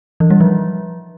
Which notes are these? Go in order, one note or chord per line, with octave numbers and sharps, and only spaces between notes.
E3
G3
F3